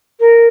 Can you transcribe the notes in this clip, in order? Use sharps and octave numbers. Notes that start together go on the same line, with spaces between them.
A#4